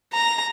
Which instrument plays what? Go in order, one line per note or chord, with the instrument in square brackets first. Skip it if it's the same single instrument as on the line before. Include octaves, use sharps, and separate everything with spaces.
[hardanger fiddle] A#5